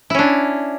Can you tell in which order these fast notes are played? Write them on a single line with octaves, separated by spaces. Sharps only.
E4 C#4 D4